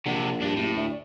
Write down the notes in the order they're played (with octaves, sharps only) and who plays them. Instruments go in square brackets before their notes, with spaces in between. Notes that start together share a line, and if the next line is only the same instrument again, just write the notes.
[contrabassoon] A#1 [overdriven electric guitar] C3 D4 [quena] F#5
[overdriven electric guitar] G2 D4 [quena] G4
[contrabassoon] F#1 [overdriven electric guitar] A2
[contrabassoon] D2 [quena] E5
[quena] D5